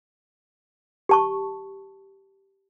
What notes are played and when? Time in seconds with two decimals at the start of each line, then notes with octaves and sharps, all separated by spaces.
1.09 G4 A5 C#6